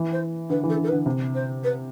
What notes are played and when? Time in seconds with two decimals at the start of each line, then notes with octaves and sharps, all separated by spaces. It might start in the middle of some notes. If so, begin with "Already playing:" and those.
Already playing: E3
0.11 C5
0.49 D3 B4
0.63 E3
0.69 A4
0.77 D3
0.83 A4
0.88 B4
0.92 D3
1.06 C3
1.34 C5
1.63 B4